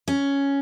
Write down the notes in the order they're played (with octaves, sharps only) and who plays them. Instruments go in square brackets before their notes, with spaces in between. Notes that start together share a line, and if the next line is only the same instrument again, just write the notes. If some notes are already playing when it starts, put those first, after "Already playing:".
[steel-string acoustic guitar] C#4